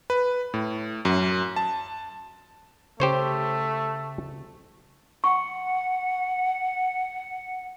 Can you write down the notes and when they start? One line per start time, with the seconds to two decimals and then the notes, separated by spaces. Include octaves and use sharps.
0.10 B4
0.54 A2
1.05 F#2
1.56 A5
3.00 C#3 A3 G4 C5 C#5
5.24 F#5 C#6